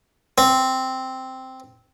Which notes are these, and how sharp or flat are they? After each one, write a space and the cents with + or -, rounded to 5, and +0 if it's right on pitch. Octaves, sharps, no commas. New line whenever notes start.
C4 -5